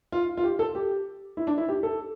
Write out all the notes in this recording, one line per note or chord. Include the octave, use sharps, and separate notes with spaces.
F4
F4
G4
A4
G4
E4
D4
E4
G4
A4